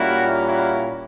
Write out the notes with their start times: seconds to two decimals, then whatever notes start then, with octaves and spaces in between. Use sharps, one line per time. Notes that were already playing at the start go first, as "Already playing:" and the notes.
Already playing: A#2 G3 A#3 C#4 E4 F#4
0.47 E4 F#4